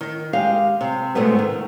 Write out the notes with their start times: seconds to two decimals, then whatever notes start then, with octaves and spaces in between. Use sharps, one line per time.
0.01 D#3
0.33 G#3 G4 F5
0.81 C3
1.15 G#2 B2 G#3 A3 B3
1.39 D#3